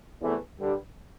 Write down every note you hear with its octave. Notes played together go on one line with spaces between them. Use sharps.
E2 C3 E3 A3
G2 D3 G3